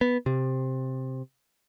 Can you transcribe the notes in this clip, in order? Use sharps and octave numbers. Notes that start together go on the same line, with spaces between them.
B3
C3